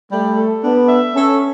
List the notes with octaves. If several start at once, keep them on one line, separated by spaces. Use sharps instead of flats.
G3 A3
A4
B3 D4
E5
C#4 A4